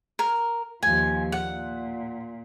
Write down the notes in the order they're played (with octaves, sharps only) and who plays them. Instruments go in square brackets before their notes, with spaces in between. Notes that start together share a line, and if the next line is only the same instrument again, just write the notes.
[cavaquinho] A#4
[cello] D#2 F3 [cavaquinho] G#5
[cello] A#2 [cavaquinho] F#5